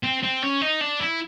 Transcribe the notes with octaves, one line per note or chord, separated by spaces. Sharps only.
C4
C4
C#4
D#4
D4
E4